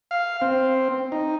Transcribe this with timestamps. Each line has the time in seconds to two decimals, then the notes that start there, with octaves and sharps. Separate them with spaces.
0.11 F5
0.42 C4
1.12 D#4